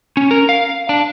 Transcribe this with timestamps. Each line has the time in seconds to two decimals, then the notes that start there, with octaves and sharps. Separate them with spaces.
0.17 C#4
0.31 A#4
0.49 F5
0.89 D4